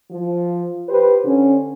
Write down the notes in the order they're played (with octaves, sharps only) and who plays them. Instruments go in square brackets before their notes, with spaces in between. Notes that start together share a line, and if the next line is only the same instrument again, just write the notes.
[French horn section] F3
G4 B4 C5
D3 C#4